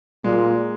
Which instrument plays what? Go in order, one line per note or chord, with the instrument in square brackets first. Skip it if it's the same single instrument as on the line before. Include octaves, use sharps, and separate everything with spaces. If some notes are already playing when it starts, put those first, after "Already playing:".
[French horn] A#2 [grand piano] G#3